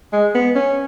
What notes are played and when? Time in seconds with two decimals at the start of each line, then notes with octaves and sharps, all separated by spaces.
0.13 G#3
0.35 B3
0.55 C#4